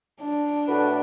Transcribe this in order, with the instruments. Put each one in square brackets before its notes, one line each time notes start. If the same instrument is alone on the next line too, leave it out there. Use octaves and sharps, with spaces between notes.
[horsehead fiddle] D4
[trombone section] A2 A3 F#4 B4